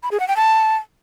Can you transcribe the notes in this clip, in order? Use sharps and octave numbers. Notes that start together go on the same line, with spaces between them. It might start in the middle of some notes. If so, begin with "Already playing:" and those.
B5
G#4
F#5
G5
A5